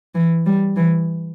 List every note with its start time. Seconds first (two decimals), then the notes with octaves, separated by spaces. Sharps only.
0.15 E3
0.46 G3
0.76 E3